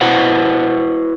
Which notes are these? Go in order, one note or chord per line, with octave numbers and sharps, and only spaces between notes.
E4 F#4 B4 C5 F#5